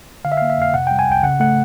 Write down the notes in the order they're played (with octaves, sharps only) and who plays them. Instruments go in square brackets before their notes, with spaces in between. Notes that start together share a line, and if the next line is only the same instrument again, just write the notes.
[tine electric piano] D3 F5
E5
A#3 F5
E5
F2 F5
C3 F#5
G3 G5
G#5
C2 G5
C#3 F#5
A3 F#5